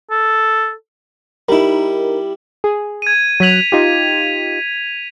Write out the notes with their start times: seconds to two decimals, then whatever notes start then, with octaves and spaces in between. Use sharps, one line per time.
0.10 A4
1.49 G3 D#4 E4 A#4
2.64 G#4
3.02 G#6 D#7
3.40 F#3 F#6 G#6 B6 F7
3.72 D#4 F4 G4